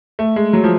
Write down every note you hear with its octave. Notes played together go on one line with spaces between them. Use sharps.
A3
G#3
F#3
F3